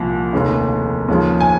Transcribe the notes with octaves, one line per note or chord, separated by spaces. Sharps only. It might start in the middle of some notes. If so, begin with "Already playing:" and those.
Already playing: C2 A#2 F3
F1 D#2 C#3
D#2 C#3 F3
G#5